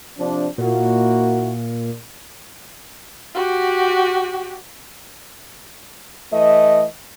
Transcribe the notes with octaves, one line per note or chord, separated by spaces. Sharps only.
C3 F3 D4
A#2 A#3 E4 F#4
F#4 G4
E3 A3 D#5